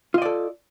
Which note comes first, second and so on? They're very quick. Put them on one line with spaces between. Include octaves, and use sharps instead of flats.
F4 D#5 D5 A4